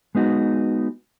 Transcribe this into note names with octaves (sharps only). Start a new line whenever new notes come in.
G#3 B3 D#4 F#4